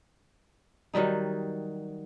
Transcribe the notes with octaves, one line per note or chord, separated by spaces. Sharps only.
D#3 F#3 G3 D#4